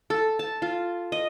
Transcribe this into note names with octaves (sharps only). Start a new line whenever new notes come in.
A4
A5
F4
D#5